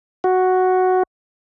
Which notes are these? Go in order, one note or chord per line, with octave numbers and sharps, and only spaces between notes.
F#4